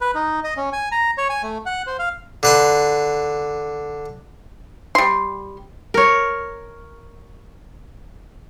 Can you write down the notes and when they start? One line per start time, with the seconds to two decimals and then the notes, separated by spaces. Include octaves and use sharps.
0.01 B4
0.15 D#4
0.44 D#5
0.57 C#4
0.73 G#5
0.92 A#5
1.18 C#5
1.29 G#5
1.43 A3
1.66 F#5
1.87 C5
1.99 F5
2.43 D3 B4 C6
4.95 G3 C6
5.94 A#4 C#5